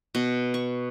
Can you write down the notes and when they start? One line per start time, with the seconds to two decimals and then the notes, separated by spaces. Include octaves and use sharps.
0.15 B2
0.54 C#6